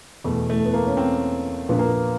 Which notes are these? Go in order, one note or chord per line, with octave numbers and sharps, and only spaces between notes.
E2 B2 A3
A3
B3
A#3
C#4
C4
A#1 A#2 F3 B3
A#3
B3